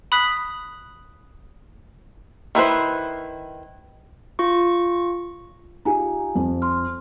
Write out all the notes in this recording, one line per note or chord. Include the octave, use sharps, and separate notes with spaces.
B5 D#6 F#6 B6
D#3 E4 B4 C5
F4 C#6
D#4 F4 G4 G#5 A#5
F2
C6 F6